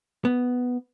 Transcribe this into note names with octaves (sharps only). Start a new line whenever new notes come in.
B3